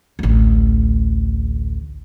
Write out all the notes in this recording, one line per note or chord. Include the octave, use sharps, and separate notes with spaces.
A1 D2